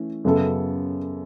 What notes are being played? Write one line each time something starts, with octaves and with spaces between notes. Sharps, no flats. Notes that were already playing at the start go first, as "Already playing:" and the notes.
Already playing: E3 A3 C#4
F#2 C#3 F#3 B3 A4